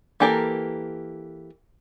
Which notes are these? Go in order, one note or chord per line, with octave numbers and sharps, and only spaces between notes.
E3 A#3 G4 A4 A#4